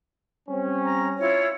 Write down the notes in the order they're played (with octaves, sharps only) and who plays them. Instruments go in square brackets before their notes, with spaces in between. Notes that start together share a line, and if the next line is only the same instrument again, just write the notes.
[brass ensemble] G3 C4 C#4
[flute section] A#5
E4 F4 C#5